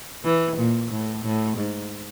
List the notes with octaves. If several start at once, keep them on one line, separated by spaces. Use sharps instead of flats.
E3
A#2
A2
A2
G#2